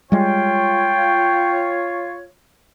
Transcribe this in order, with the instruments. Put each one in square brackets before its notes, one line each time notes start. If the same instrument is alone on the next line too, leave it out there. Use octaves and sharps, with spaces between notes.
[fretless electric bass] G3 G#3 [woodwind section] F4 C#5 [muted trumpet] G5